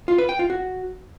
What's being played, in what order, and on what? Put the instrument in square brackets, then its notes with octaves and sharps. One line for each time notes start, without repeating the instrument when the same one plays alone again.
[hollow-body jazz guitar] F4
B4
G5
F4
F#4